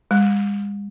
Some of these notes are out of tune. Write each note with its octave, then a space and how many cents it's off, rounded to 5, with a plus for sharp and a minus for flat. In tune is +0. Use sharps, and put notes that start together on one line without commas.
G#3 -45